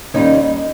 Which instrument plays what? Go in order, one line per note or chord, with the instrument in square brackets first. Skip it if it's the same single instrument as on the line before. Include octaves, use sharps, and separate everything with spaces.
[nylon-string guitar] D#2 D#3 G3 C#4 D#4